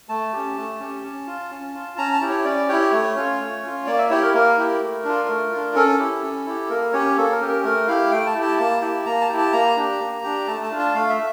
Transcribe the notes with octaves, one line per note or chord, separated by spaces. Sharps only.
A3 A5
C#4 G4
A3
C#4 G4
C#4
F4
C#4
F4
C#4 A#5
A5
E4 G4
C#5
C#4 D5
E4 G4 C#5
A3 C#5
C#4 F4
A3
C#4 F4
A#3 D5
E5
E4 G4 C#5
A#4
A#3 A#4
E4 G4
A3
D4 F4
A3
D4 F4
C#4 A4
E4 G4
C#4
E4 G4
A#3 A#4
C#4 G4 C#5
A#3 A4
A#4
C#4 G4
A#4
A3 A#4
E4 G4 F5
A3 G5
A5
E4 G4
A5
A#3 A5
E4 G4
A#3 A#5
A5
E4 G4
A5
A#3 A#5
D4 G4
A#3
D4 G4
A3 A5
A5
D4 F4
A5
A3 F5
E5